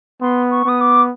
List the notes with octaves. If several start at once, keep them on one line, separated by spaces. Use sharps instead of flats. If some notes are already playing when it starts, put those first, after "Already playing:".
B3 C6
C#6
B3 D#6
D6